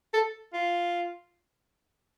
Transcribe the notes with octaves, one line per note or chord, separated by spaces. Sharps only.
A4
F4